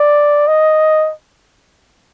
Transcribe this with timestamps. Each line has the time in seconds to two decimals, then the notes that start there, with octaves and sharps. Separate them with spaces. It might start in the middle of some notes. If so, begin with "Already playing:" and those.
Already playing: D5
0.48 D#5